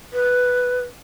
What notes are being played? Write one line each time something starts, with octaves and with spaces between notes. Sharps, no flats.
B4